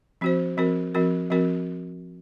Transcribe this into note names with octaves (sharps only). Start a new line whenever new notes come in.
F3 C4 F#4 C5
F3 C4 F#4 A#4
F3 C4 F#4 A#4
F3 C4 F#4 A#4